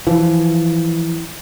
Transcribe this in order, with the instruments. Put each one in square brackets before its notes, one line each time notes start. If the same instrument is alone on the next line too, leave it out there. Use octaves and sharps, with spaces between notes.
[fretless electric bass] E3 F3